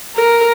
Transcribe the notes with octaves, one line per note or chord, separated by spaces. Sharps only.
A#4